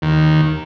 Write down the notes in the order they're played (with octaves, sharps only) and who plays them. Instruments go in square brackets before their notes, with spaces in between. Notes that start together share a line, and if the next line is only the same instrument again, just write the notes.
[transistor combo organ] D#2